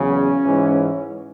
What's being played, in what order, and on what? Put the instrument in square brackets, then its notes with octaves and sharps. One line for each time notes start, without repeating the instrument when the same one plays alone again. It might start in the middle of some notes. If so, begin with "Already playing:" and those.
Already playing: [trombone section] E2 C#3 F#3 C#4
G#2 E3